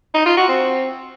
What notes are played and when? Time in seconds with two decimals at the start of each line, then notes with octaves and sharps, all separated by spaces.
0.14 D#4
0.26 F4
0.37 F#4
0.48 C4